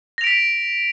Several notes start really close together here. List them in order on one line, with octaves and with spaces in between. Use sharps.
A#6 F7 D7 B6